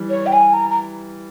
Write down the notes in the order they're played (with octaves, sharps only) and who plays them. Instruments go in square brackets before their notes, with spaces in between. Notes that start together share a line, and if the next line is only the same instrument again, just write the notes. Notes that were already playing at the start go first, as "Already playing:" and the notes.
Already playing: [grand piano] E3 G3
[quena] C#5
G5
G#5
A#5
A#5